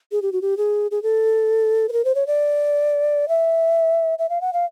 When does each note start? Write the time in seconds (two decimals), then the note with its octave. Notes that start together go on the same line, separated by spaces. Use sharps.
0.12 G#4
0.22 G4
0.33 F#4
0.42 G4
0.57 G#4
0.91 G#4
1.03 A4
1.89 B4
1.93 A#4
2.05 C5
2.15 C#5
2.27 D5
3.28 E5
4.19 E5
4.29 F5
4.41 F#5
4.53 F5